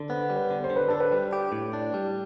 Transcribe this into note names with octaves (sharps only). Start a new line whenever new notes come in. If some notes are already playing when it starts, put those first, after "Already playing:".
Already playing: D3
B3 C5
G3
B4
D3
C5
D3
B4
D4 A4
B4
G3
G4
A2
D4 D5
G3